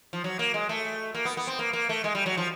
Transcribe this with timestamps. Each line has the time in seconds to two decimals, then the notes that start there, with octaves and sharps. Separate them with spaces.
0.13 F3
0.24 F#3
0.39 A#3
0.54 G#3
0.69 A3
1.15 A#3
1.25 B3
1.37 B3
1.47 C4
1.59 A#3
1.73 A#3
1.89 A3
2.04 G#3
2.15 G3
2.26 F#3
2.37 F3